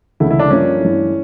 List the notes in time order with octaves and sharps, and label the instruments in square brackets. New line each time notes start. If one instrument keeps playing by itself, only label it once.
[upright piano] E1 D2 C#3 [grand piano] E4
[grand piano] E4
D4
[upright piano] G2 F3 A#3 D4 [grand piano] C#4
[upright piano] G2 E3 A3 E4